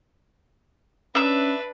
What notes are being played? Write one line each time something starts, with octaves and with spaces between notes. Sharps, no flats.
C#4 D4 B4 E5 E6